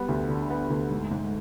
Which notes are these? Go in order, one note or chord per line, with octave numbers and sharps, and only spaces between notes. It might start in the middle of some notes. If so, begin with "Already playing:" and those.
Already playing: G3 B3
D2
D3
B3
D2
G#2
G#2